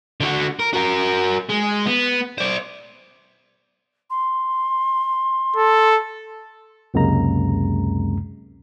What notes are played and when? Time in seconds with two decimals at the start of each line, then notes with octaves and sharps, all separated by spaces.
0.21 D3 F#4
0.60 A#4
0.73 F#4 A#4
1.50 G#3
1.86 B3
2.38 C5 D5
4.10 C6
5.56 A4
6.94 C#2 F#2 C3 G#3 A#3 A#5